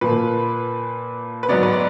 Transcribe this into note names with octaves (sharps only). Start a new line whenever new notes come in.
A#2 F3 A#3 B4
B4
G#2 F#3 B3 D5
B4
D5